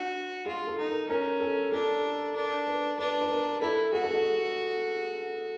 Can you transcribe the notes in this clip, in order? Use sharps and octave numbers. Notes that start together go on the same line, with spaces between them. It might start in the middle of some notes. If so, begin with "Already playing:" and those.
Already playing: D4 F#4
F4 G#4
A4
D#4
A#4
C#4 A#4
A4
D4 A4
D4 A#4
B4
D4 B4
B4
A#4
E4 A4
F#4 G#4
A4
G#4